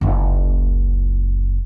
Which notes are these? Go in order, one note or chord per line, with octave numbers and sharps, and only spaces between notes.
F#1 C#2